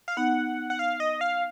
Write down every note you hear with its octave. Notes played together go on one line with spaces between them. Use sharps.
F5
B3 D#4 F#5
F#5
F5
D#5
F5